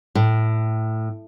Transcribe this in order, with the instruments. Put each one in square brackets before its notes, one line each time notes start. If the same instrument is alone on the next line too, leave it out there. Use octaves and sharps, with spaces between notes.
[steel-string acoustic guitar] A2